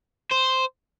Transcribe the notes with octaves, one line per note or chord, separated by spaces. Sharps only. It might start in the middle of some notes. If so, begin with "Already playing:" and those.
C5